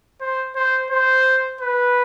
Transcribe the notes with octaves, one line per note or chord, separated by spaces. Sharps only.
C5
C5
C5
B4